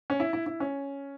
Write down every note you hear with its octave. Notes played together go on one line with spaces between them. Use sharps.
C#4
E4
E4
E4
C#4